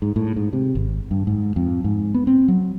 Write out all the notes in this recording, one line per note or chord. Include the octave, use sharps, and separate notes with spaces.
G#2
A2
G#2
C3
G#1
G2
G#2
F2
G#2
B3
C4
F#3